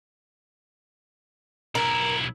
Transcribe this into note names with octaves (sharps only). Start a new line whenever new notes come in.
B1 E4 A#4